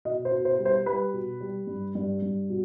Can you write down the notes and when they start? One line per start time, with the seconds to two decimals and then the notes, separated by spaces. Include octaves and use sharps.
0.05 B2 D#5
0.25 C5
0.32 B2
0.45 C5
0.58 G3
0.65 C5
0.86 G3 B4
1.13 B2
1.41 G3
1.67 G2
1.95 G2
2.22 G2
2.50 B2